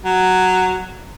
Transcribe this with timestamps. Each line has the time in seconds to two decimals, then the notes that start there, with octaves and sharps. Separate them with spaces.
0.04 F#3